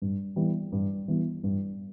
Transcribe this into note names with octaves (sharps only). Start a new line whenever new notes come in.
G2
E3 G3 B3
G2
E3 G3 B3
G2